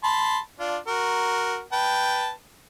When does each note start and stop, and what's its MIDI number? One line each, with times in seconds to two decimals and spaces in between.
0.04 0.39 81
0.04 0.39 83
0.04 0.39 84
0.60 0.77 62
0.60 0.77 65
0.88 1.61 66
0.88 1.61 70
1.73 2.31 71
1.73 2.31 79
1.73 2.31 81